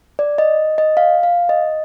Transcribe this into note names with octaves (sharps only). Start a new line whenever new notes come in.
D5
D#5
D#5
F5
F5
D#5